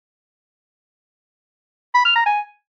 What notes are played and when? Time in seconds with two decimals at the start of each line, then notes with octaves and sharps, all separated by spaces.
1.94 B5
2.05 F6
2.15 A#5
2.26 G#5